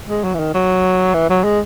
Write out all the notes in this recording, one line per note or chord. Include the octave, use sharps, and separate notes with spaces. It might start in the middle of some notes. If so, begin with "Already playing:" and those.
G#3
F#3
E3
D#3
F#3
E3
F#3
G#3